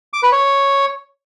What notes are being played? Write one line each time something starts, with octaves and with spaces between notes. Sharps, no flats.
D6
B4
C#5